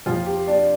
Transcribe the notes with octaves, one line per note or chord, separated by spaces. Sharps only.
F2 F3 F4
G4
D4